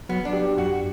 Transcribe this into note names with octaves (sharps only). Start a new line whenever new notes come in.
F#3 B3
D4
G4
F#2 F#4